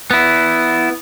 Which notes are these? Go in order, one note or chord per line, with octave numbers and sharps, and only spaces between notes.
B3 E4